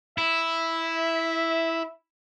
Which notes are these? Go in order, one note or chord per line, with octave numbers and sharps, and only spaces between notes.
E4 E5